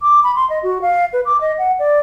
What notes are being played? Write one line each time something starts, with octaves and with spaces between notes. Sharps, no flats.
D6
B5
C6
D#5
F#4
F5
B4
D6
D#5
F#5
D5